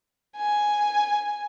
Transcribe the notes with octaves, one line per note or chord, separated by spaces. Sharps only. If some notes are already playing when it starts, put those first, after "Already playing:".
G#5